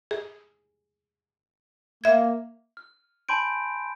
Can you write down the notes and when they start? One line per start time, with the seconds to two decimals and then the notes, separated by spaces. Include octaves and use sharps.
0.11 G#4
2.04 A#3 E5 G#6
2.77 F6
3.29 G#5 A5 B5 C6 G6 D7